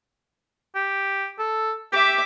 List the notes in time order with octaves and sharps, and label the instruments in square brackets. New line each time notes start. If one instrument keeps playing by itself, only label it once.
[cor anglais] G4
A4
[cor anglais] G4 [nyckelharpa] E5 D6